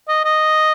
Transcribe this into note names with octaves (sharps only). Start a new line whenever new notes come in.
D#5
D#5